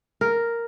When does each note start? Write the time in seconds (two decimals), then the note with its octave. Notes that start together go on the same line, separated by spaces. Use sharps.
0.21 A#4